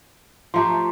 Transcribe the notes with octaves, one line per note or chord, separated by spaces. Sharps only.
F3 A3 G4 A5 A#5 C6